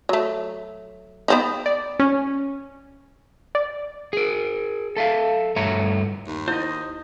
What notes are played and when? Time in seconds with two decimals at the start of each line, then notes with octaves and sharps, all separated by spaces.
0.09 F#3 A3
1.28 B3 C4 D#4
1.66 D5
1.99 C#4
3.55 D5
4.13 G#4 A#4
4.97 A4 E5 F5
5.56 G2 A3 C#5 E5 A#5
6.27 D#2
6.48 E4 C5 D#5